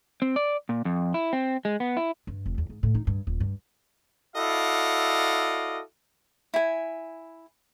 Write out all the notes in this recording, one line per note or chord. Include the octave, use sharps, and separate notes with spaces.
C4
D5
A#2
F2
E4
C4
G#3
B3
E4
G2
F1
E2
G#2
A2
D#4
G2
D#1
G2
E4 F#4 A4 D5 D#5 F5
E4 G#5